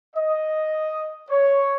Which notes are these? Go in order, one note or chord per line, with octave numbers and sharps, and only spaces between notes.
D#5
C#5